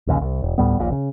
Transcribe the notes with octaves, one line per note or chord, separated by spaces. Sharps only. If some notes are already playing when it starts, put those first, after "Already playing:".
A#1 D#2 A#2 C#3
C2
E1
D2 A2 G3 B3
D#1 A#1 A#2
C#3